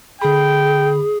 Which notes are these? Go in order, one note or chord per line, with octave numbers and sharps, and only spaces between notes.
D3 G#4 G5 B5